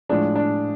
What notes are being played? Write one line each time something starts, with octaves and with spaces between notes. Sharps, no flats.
A2 F3 G#3 D4
D4